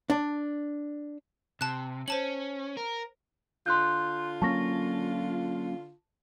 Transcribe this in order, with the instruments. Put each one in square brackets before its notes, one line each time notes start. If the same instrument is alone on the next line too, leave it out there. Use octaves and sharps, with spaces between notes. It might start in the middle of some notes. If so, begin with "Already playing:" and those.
[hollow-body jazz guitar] D4
[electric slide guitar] C3 [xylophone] A5 F#6
[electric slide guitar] C#4 [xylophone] C5 A5 F#7
[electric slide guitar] A#4
[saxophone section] D3 F4 [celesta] C6 F#6 G6
[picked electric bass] F#3 A#3 C#4 [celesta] A5 C#6 A#6